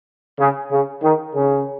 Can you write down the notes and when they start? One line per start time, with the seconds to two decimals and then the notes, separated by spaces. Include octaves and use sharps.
0.39 C#3
0.70 C#3
1.02 D#3
1.34 C#3